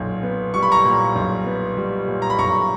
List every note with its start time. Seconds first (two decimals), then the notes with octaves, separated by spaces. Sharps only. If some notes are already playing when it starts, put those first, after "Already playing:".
Already playing: B1 A#2
0.23 B3
0.54 G3 C#6
0.63 B5
0.72 A#5 C#6
0.85 A#2
1.16 B1
1.46 B3
1.77 G3
2.08 A#2
2.22 A#5
2.30 B5
2.38 B1 A#5 C#6